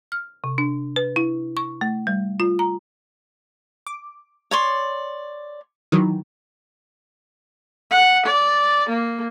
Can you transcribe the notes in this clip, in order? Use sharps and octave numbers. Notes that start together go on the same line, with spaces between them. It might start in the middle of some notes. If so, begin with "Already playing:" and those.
F6
C3
D4
B4
E4
C#6
A3
G3
F4
A#5
D6
C#5 D5 C6
D#3 E3 F#3
F#5
D5
A#3